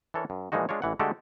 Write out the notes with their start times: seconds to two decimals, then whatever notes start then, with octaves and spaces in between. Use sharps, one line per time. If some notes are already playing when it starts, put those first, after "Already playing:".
0.14 E3 D4 A4 A#4 C#5
0.30 F#2
0.52 A#2 E3 F3 G#3 D#4 F#4
0.69 G#3 D4 F4 C#5
0.82 A1 E3 F#5
0.99 D3 G#3 A3 F#4 G4 A4